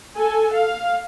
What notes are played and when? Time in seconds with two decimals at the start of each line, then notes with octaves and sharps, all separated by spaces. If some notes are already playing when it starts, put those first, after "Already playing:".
0.17 A4 G#5
0.53 F5